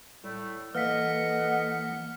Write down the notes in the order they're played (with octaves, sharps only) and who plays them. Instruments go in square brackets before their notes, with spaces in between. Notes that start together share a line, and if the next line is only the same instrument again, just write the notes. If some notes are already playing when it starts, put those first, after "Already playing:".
[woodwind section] A2 G3 A3
[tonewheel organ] E3 A#3 [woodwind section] A4 B4 D#5 [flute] F#5 [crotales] F6 B6